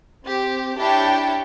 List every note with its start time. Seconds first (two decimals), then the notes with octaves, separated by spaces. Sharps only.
0.25 C4 G4
0.78 D4 E4 G4 C#5 G5 A5